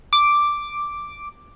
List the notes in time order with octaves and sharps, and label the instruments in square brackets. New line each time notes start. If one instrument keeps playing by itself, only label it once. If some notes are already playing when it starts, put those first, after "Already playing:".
[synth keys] D6